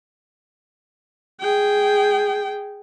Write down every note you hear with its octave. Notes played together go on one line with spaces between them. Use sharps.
G#4 G5